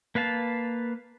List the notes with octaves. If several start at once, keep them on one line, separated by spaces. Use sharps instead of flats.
A#3 B4 F5 A5